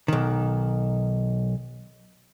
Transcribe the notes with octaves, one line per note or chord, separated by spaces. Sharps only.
B1 D#3